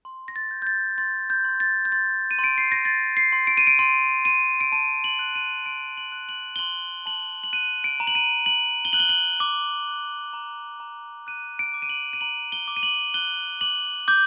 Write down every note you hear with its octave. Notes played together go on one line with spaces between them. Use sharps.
C6
A#6
A6
G6
G6
A6
C6 A6
G6
C6
A6
G6
C6 A6
D#7
C6
D7
C7
A#6
C6 A6
C7
C6
D7
D#7
D7
C6 D7
C6 D#7
D7
A5 D#7
F#7
F#6
D#7
C6 D7
F#7
F#6
F#7
G7
C6 F#7
A5 F#7
F#7
F#6 D#7
D7
A#5
F#7
D#7
A#5 F#7
G7
F#6 F#7
G7
F#7
D6
F#6
A#5
A#5
F#6 D#7
D7
D6
D#7
F#7
D#7
A#5 F#7
G7
D6
D#7
F#7
F#6 G7
D6 F#7
D6 G6